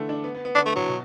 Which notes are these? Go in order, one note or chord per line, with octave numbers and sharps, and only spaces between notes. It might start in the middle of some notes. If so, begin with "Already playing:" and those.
Already playing: D3 E3 A3
D4
B3
B3
B3
D3 D4
A3
A2 F#3
B2